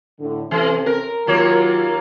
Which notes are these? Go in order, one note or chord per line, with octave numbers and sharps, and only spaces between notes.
A2 D3
C3 E3 C#4 A4
A#4
D#2 F#3 A#3 F4 C#5